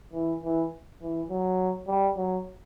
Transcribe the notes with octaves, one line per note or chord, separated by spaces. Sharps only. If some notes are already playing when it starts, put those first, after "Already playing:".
E3
E3
E3
F#3
G3
F#3